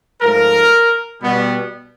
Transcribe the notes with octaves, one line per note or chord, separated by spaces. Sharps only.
G#2 F3 A3 A#4
B2 G3 B3